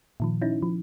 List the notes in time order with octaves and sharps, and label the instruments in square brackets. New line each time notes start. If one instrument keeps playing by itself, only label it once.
[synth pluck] A#2 D#3 F3
C#4 D#4 E4
F3